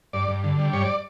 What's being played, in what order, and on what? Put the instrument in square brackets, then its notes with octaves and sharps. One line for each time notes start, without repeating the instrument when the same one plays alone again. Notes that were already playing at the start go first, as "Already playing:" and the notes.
[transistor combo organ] G2 D5
G2
D3
G3
G2 C#5
D5